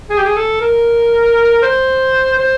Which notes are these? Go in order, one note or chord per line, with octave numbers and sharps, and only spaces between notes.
G#4
G4
G#4
A4
A#4
C5
C5